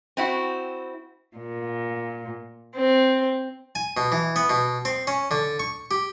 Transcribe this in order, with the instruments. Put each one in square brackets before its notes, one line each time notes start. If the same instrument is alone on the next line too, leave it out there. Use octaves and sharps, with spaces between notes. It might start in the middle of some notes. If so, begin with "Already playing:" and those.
[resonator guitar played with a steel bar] C4 E4 F#4
[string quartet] A#2
C4
[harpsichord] G#5
B2
E3
B3
B2
C4
C#4
D3
C#6
G4